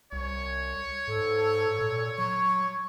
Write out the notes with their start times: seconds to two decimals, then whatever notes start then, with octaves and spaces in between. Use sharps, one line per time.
0.13 C2 C#5
1.08 G#2 A4
1.79 A#2
2.18 F#3 C#6